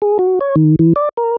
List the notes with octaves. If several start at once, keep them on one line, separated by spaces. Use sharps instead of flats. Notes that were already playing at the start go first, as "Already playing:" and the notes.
G#4
F#4
C#5
D#3
E3
D5
A#4